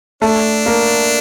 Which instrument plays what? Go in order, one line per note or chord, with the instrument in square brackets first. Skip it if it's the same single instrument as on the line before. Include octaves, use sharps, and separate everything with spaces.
[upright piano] A3 [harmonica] D4
[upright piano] A#3